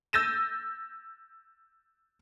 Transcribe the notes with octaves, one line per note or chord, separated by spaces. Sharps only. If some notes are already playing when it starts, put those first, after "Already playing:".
E6 G6 A6 A#6 D#7 E7